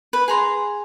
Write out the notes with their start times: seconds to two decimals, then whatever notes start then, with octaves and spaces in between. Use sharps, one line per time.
0.13 B4
0.28 G#4 A#5 C6